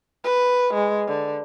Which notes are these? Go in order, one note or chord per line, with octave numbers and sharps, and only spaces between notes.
B4
G#3
D3